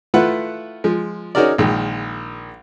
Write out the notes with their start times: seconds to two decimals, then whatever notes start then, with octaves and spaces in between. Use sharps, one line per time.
0.14 A3 E4 F4 B4 F#5
0.84 F3 G#3
1.35 C#4 D#4 F#4 G#4 A#4 D5
1.58 A#1 D#3 G#3